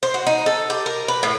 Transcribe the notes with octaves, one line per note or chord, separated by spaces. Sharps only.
C5
F#4
D#4
A4
G4
A#4
B4
A2